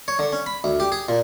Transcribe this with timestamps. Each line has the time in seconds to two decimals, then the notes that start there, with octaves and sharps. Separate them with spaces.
0.08 C#5
0.19 D3
0.32 C#4
0.46 B5
0.64 D2
0.80 G4
0.92 G#4
1.09 A#2